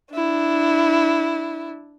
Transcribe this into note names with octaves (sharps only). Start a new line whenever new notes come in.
D4 E4